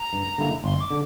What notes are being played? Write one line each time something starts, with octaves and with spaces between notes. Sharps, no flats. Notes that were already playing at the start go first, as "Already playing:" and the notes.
Already playing: A#5
G2
D3 G3 A#3 E4
G1 C6
D6
D3